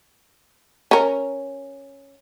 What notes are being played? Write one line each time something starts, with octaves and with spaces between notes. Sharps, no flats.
C#4 A#4